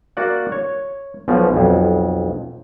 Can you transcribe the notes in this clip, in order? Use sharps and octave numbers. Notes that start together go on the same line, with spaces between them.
A#3 F#4 D5 F#5
C#5
B1 B2 F3
B1 F2